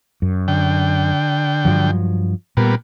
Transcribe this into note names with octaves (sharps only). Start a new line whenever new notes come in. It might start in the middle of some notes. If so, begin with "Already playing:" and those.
F#2
D3 G5
G2 F3 F#3
A#2 G3 A#3 B3